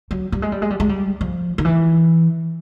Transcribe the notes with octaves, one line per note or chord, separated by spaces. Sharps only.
F#3
G3
G#3
G3
G#3
G3
G#3
G3
F3
D#3
E3